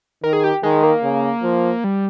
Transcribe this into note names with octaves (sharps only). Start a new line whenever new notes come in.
D#3 A#4
G#4
G4
D#3 G#3
A#3
C#3
F3
G3